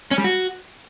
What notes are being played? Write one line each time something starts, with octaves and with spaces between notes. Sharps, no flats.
C#4
G3
F#4